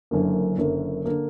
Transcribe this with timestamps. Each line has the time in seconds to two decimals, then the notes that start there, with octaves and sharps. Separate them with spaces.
0.11 F#1 F#2 D3 A#3
0.58 F#1 F#2 D3 A#3
1.05 D3 A#3